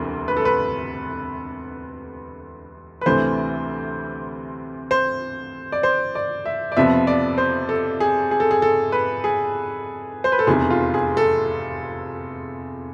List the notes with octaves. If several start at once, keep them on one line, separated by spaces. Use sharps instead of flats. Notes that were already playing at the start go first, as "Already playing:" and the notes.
Already playing: E1 D2 C3 E3
B4
A4
B4
B4
D2 C3 E3 A3 C5
C5
D5
C5
D5
E5
D5
F2 C3 F3 B3 E5
D5
C5
A4
G#4
G#4
A4
G#4
A4
B4
G#4
C5
B4
A4
F1 E2 C3 G#4
F4
G#4
A4